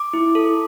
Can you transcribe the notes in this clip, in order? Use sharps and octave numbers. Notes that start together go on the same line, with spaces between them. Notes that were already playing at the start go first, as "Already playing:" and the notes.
Already playing: D6
E4
A4